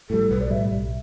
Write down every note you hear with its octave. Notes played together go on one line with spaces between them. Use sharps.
A2 G3 A4
B1 B4
D5
A2 G3 E5
B1